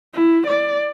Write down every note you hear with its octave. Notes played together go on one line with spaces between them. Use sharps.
E4
D5